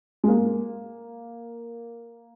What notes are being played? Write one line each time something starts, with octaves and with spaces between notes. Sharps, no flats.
G#3
A#3